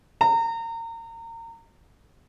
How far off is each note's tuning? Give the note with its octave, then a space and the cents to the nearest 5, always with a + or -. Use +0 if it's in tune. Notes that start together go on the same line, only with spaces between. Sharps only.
A#5 -30